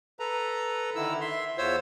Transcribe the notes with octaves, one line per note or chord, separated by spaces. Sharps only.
A4 B4 A#5
D3 D#3 E4 E6
E5 C6
E2 F4 C5 C#5 E6